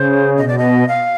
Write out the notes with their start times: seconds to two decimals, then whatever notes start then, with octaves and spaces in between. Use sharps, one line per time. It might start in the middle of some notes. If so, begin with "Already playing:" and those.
Already playing: C#3 C5
0.37 B2 D#5
0.48 D5
0.58 D#5
0.88 F5